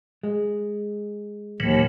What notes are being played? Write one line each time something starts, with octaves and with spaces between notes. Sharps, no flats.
G#3
D#2 A#2 E3 F#3